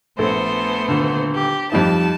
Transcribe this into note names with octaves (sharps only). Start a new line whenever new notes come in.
A#1 A3 B3 A4 C5
D#1 D3
G4
F2 G3 D#4 A5